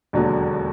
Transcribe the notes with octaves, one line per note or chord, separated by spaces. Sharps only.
E1 D#2 D3 F#3